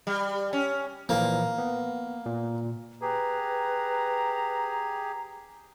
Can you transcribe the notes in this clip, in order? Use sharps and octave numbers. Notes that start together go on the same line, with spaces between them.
G3
C#4
A#2 E3 F3 A#3
B3
A#2
G4 G#4 B4 A#5